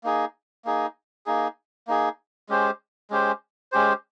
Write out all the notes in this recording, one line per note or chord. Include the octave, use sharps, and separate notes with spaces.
A#3 D#4 G#4
A#3 D#4 G#4
A#3 D#4 G#4
A#3 D#4 G#4
G#3 C#4 G4 C5
G#3 C#4 G4 C5
G#3 C#4 G4 C5